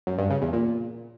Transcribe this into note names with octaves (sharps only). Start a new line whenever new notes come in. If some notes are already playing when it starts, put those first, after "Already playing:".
F#2
G2
C#3
E2
A#2